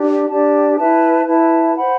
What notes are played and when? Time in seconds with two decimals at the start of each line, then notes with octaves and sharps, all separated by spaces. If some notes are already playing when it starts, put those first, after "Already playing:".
Already playing: D4 G4 D5
0.28 D4 G4 D5 A5
0.77 E4 B4 E5 A5
1.25 E4 B4 E5 A5
1.74 C5 F#5 B5